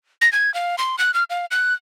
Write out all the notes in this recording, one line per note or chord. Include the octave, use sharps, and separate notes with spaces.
A#6
G#6
F5
C6
F#6
F6
F5
F#6